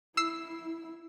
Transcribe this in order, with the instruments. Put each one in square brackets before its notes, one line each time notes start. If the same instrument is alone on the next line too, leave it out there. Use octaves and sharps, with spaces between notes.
[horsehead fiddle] E4 [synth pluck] E6 C7